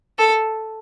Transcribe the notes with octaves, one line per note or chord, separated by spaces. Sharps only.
A4